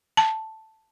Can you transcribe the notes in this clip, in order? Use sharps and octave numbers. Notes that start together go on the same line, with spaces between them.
A5